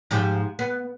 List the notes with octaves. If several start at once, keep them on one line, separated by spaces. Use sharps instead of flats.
G#2 F3 G4
B3